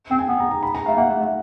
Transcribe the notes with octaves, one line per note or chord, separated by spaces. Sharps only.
C4 G5
G#5
B3
A#5
A#5
B5
A#5
A3 F5
A#3 F#5
A3
A3